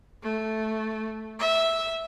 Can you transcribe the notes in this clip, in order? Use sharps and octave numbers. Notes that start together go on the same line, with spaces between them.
A3
E5